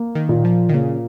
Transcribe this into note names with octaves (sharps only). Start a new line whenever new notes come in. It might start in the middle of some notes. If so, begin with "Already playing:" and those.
Already playing: A#3
D#3
A#2
F3
D#3
C#3 A#3